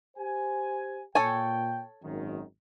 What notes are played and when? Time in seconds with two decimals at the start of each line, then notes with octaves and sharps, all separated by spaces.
0.17 G4 C5 G#5
1.15 A#2 A4 C#5 G5 G#5
2.03 G#1 F#2 D#3